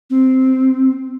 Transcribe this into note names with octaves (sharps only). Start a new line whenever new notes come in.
C4